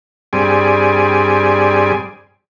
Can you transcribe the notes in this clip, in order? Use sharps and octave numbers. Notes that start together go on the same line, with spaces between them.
G2 G3 C4 G#4 D5 G#5